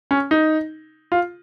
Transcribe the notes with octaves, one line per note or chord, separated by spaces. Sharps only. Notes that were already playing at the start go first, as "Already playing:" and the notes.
C#4
D#4
F4